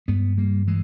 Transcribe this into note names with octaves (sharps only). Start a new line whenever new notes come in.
G2 G#3 B3
G3 A#3
E3 G#3